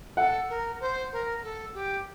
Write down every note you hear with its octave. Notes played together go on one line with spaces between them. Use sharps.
A4 F#5
A#4
C5
A#4
A4
G4